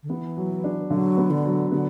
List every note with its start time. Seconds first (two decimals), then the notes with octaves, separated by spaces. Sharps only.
0.03 D3
0.09 E3 B3
0.37 F#3
0.64 D4
0.90 D3 F#3
1.17 B3
1.31 D3
1.45 F#3
1.71 D3 B3